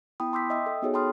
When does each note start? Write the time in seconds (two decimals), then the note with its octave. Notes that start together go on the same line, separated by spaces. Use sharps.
0.20 B3 E4 G5 B5 D#6
0.33 A5 C6 D6 E6 G6 B6
0.50 D#5 E5 G5 D#6 E6
0.66 A4
0.82 B3 D#4 F#4 G#4 A4 C#5
0.94 G5 A5 B5 C6 D#6 F6